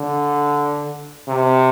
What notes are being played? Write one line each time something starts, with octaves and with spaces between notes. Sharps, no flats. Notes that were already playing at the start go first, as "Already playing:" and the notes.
Already playing: D3
C3